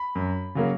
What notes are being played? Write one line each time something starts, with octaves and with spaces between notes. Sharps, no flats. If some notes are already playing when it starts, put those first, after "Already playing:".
Already playing: B5
F#2
C#3 F#3 A#3